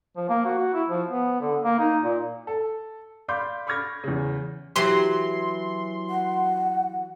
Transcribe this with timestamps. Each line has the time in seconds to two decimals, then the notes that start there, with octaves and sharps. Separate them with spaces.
0.16 F3
0.29 A#3
0.45 F#4
0.58 F#4
0.74 E4
0.88 F3
1.09 B3
1.41 D3
1.62 A#3
1.79 D#4
2.02 A#2
2.47 A4
3.28 D5 F5 B5 C6 D6 G6
3.67 B5 C#6 D6 F6 G#6 A#6
4.04 E2 C#3
4.76 E3 F#3 G4 C6
6.10 F#5